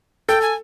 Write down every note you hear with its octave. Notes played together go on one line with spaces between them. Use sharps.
A4 G5
G#5